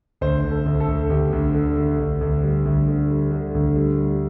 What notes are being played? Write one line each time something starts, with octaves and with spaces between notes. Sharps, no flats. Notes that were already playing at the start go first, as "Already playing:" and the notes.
D2 C5
D2
A4
D2
A4
D2
D2 G4
D2
D3
D3
D2
D2
G3
D2
D3
G3
D3
D2
G3
G3